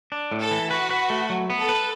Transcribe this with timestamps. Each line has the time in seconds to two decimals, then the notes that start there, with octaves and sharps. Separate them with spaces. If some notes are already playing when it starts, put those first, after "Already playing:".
0.12 D4
0.31 A2
0.41 A4
0.51 E3
0.71 F#4 B4
0.90 B4
1.10 A3
1.30 F#3
1.50 B3
1.59 A4
1.69 B4